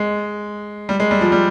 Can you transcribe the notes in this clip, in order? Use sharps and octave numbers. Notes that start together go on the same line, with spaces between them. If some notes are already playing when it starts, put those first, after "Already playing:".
Already playing: G#3
G3
G#3
G3
F3
G3